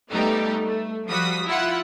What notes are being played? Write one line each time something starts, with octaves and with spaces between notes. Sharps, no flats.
G3 A3 B3 D#4 G4
A3
F3 G3 F#4 D#6 B6
E4 F4 F#5